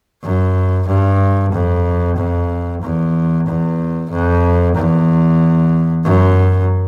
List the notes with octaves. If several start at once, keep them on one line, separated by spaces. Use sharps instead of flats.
F#2
G2
F2
F2
E2
E2
F2
E2
F#2